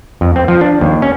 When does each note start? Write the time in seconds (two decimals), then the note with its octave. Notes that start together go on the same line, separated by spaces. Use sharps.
0.21 F2
0.36 C4
0.48 F3
0.61 D4
0.81 D#2
1.02 C#4